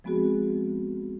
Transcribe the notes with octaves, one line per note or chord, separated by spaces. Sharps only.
F3 G#3 B3 C4 F#4 G#4